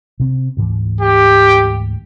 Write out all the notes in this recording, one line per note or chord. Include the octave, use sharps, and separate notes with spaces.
C3 C4
D2 G#2 E3
G4